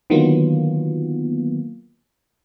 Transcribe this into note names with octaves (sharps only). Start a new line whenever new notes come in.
D3 D#3 F#3 A#3 B3 F4